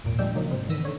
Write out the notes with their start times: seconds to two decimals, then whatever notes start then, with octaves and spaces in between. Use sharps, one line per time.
0.04 G#1 E2 A#2 D7
0.18 F3 G3 G#3 D4 G5 E6
0.34 C#3 F3 F#3 A#3 D#4
0.51 G#2 C3 C4
0.69 D#3 E3 E6 A#6 B6 D#7
0.85 D3 C#5